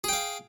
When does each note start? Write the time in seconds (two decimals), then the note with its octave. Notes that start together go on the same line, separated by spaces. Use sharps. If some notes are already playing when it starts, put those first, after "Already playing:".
0.04 G#4
0.08 G5
0.13 F5